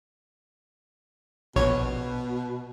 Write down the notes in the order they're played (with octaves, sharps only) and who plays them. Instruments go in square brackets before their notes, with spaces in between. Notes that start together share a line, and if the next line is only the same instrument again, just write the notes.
[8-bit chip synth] A#1 C#5 [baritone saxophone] B2